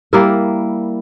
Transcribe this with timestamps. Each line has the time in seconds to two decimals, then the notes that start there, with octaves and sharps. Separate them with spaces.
0.13 G3 A#3 E4 A#4